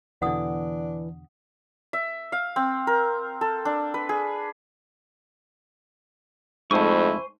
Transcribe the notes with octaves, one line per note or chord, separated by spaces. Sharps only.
E2 B2 D3 E3 D4 F#5 D#6
E5
F5
C4
A#4
A4
D4
B4
G#4
F2 G#2 A3 E4 C5 G#5 C#6